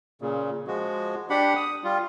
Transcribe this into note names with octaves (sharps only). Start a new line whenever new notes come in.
A#2 C#3
F3 G#3 F#4
D4 G4 F#5 B5
D#6
G3 F4